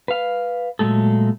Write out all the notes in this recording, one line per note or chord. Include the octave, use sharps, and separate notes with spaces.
B4 F5
A#2 F#3 G#3 A3 A4